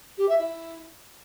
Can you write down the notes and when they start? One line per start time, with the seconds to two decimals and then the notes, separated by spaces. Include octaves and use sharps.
0.17 G4
0.28 E5
0.39 E4